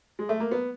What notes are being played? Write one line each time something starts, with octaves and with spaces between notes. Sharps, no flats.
G#3
A3
A#3
B3